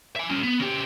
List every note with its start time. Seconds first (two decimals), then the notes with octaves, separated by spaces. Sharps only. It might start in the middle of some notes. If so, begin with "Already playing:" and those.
0.16 E5 G#5
0.30 G3 C#4
0.43 B3
0.60 C#3 G4